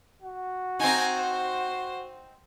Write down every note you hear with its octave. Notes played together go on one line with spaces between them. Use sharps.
F#4
C4 D#4 G#5 A#5
C5